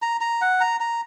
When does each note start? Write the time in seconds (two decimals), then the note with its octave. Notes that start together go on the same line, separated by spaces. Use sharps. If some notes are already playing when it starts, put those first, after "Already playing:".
0.02 A#5
0.21 A#5
0.41 F#5
0.61 A#5
0.80 A#5